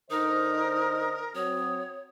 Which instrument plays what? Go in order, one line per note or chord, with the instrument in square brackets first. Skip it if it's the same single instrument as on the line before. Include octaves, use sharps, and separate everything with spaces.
[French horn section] D3 C5 D#5 [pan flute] D#4 [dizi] A#4 [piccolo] D#6
[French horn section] F#3 C4 F#4 [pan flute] C#5 [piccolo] D#6